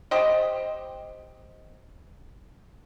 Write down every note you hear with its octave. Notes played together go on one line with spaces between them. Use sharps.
G4 C5 D#5